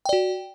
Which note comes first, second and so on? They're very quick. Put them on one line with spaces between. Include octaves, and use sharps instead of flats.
G5 D5 F#4